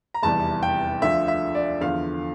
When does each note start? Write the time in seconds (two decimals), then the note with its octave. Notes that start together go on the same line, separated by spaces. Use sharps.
0.14 A#5
0.23 F1 E2 E3 G3 A5
0.63 G5
1.02 D2 D3 F3 E5
1.28 E5
1.55 D5
1.81 E2 D3 F3 F5